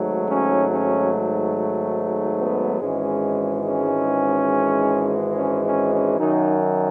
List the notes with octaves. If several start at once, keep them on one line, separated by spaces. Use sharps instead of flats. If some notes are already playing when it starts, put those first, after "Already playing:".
Already playing: G#1 G#2 F#3 A3
C#4
C#4
B3
G#1 G#2 E3 G#3 C#4
C#4
C#4
C#4
C#4
F#2 D#3 F#3 D#4